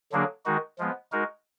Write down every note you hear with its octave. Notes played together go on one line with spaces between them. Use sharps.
D3 F#3 A#3 D4 G#4
D#3 G#3 D#4 F#4
F3 G#3 B3
G#3 D#4 F#4 A#4